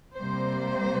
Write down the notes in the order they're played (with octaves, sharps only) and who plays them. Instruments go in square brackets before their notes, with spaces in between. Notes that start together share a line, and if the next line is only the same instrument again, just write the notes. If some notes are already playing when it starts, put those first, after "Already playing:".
[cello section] C3 G3 A#3 C5